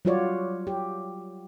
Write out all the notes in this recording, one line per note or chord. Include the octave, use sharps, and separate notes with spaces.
F#3 G3 F4 F#4 C#5 D5
G4